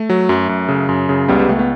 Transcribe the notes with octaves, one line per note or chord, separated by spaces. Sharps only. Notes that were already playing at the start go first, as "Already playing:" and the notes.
Already playing: A3
F#3
F#2
F#2
C#3
F#2
C#3
C#2 G3 B3
G3
C#2 A3
B3